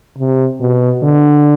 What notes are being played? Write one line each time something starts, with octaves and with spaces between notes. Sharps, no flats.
C3
B2
D3